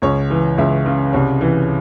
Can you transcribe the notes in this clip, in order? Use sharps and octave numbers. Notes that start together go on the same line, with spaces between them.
C#2 C#5
E3
C#2 E5
C#3
C2 C#5
E3